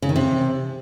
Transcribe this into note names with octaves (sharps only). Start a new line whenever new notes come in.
C#3
D#3
C3